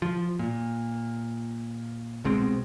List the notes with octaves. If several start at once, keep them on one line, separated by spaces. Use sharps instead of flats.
F3
A#2
C2 B2 G#3 C4